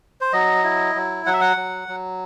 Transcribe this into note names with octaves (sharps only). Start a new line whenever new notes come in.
C5
F#3 D#5
E4
F#3
F#3 F#5
E5
F#5
F#3
F#3